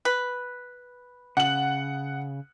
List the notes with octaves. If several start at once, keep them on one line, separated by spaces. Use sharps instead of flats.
B4
C#3 F#5 F#7